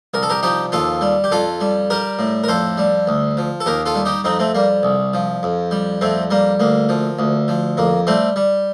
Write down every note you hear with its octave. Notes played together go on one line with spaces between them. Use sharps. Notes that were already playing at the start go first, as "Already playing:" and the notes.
C2 A#4
A4
G4 A#4
F3 D#4 G4
D#2 F4 A4
G3
G4
F2 F4 A4
G3
G3 G4 A#4
A2
A#4
F2 A4 C5
G3
D2
F3
A4
D#2 G4 A#4
F4 A4
G3
D#4 G4
F2 C4 D#4
A3 C4
G3 A#3
C2
F3
F2
G3
F2 A3 C4
G3 A#3
D2 A#3
F3
D2
F3
F2 A#3
G3 A3 C4
G3